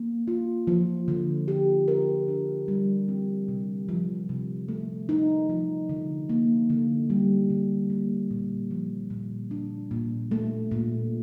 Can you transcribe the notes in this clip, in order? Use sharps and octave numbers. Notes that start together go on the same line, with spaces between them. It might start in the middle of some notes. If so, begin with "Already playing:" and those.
Already playing: A#3
F4
F3
D3
G4
A#4
D4
G3
C4
C3
F3
C3
A3
D#4
F3
D3
A#3
D3
G3
D3
A#3
A#2
F3
A#2
D4
A#2
A3
A#2